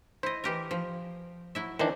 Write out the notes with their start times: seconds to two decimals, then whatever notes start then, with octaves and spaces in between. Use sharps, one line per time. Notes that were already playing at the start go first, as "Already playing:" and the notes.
0.23 E4 C5 D#5
0.44 E3 G4 A#4
0.71 F3
1.55 F#3 E4 E5
1.79 D#3 E3 D4 C5